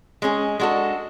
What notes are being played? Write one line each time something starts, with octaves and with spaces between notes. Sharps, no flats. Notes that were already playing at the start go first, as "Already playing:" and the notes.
G#3 C#4 G#4
G#3 D4 F#4 A4